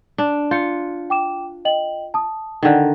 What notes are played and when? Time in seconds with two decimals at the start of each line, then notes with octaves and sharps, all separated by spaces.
0.18 D4
0.51 F4 G6 C#7
1.10 G5 D6 E7
1.65 D#5 G5 F#7
2.14 A5 D#6
2.63 D3 D#3